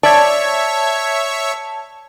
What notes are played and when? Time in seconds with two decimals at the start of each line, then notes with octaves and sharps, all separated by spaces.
0.03 C#5 D5 E5 A5 C#6 G#6